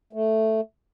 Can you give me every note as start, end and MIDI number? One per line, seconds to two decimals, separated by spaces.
0.13 0.61 57